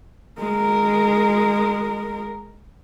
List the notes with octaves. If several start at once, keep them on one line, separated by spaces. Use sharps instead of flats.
G#3 A#4